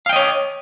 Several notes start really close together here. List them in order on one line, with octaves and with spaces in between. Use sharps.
F5 G5 D#5 C#5